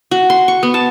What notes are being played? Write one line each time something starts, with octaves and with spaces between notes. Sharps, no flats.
F#4
C6
C#6
B3
A5